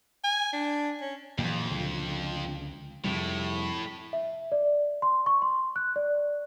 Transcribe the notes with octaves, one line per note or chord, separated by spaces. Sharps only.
G#5
D4
C#4
F2 A#2 E3 F#3
C#2 D3
F2 A2 C3 G3
E5
D5
C6
C#6
C6
F#6
D5